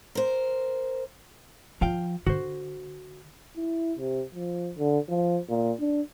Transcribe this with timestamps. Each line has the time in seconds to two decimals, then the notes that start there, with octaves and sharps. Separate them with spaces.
0.15 A#4 C5
1.81 F3 F4 F5 G5
2.26 D3 F#4 C5
3.57 E4
3.99 C3
4.35 F3
4.78 D3
5.09 F3
5.49 A#2
5.80 D4